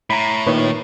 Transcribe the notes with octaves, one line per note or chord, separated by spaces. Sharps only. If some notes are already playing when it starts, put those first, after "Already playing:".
A2 A#5 B5
A#2 D#3 B4 C#5